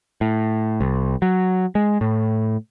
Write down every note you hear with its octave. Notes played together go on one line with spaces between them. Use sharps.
A2
C2
F#3
G#3
A2